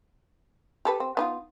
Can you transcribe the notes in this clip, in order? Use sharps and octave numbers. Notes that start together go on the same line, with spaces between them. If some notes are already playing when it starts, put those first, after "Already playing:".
G4 A4 B4
C4
B3 D#4 F4